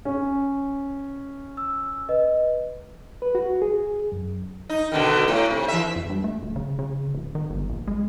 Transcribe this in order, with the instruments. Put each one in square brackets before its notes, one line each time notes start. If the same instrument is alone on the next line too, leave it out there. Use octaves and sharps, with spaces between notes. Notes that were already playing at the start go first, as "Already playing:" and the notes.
[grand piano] C#4
[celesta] E6
B4 D#5
[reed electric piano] B4
F#4
G#4
F#2
[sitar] D#4
B2 D3 D#3
A2
C3
E3 E5
[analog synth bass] F2
G2
A3
D1
C#3
C#3
D1
D#3
G1
A#1
G#3